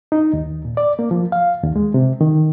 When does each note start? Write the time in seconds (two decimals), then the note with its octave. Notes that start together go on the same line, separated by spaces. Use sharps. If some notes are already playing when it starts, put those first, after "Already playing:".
0.12 D#4
0.33 D#2
0.65 A#2
0.77 D5
0.99 A#3
1.11 F3
1.32 F5
1.63 D#2
1.76 G#3
1.94 C3
2.21 D#3